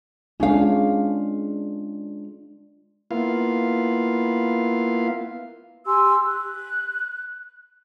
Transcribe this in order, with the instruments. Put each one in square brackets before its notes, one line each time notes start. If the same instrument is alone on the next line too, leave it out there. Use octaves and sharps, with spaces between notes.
[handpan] G#3 D4 F4 [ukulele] C#4 F5
[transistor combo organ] A#3 B3 E4 F4 F5
[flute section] G4 G#5 C6 E6
F#6